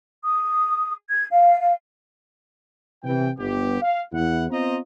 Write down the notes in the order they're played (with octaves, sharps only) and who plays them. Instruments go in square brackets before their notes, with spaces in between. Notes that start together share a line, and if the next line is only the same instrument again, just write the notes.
[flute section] D#6
G#6
F5
F5
[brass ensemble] C3 E3 G5
G1 B3 G4
F5
E2 E4 F#5
B3 C4 F4 C5 D#5 A#5